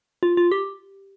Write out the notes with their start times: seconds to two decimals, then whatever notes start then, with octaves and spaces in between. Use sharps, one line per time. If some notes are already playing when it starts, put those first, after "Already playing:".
0.23 F4
0.37 F4
0.52 G4